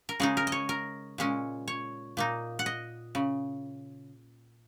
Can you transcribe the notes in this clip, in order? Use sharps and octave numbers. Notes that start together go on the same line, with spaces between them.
A#4
C#3 G#3 D#4 G#4
A#4
D#5
C#5
A#4
A#2 G#3 C#4
C#5
A#2 A#3 D#4
F#5
D#5
C#3